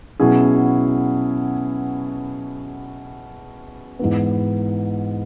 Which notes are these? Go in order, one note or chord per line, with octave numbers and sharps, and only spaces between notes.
B2 F#3 C#4 E4 G#4
G#2 E3 B3